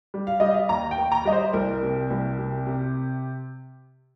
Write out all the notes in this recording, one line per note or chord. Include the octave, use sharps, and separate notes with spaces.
G3
F5
G3 D#5
F5
D#2 A#5
G5
D#2
A#5
G3 D#5
C5
C2 A#4
C3
C2
C3
C3